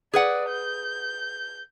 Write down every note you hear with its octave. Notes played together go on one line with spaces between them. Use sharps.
G#4 B4 D5 F#5
G6